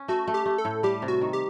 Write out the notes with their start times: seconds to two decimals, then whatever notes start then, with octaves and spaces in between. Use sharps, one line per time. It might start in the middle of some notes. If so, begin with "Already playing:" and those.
Already playing: C#4
0.08 A3 F#4
0.28 A3
0.34 G4
0.46 A3
0.58 A4
0.65 A2
0.83 G3 G4
1.02 C3
1.08 F#4
1.21 D#3
1.33 G4